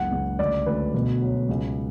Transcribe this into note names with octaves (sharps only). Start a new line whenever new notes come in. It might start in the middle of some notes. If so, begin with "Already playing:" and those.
Already playing: F#1 C#2 F#5
C#2
D2 D5
D2 B4
B2
F#3
C#2